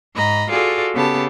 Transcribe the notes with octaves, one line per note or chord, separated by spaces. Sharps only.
G#2 D#5 A#5 B5
F4 F#4 G#4 A4 D5
C#3 B3 G4 A4 A5